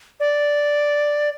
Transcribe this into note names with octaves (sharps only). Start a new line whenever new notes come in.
D5